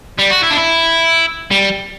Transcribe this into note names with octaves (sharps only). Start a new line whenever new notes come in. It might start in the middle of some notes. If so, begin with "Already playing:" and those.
G3
F#4
E4
D4
E4
G3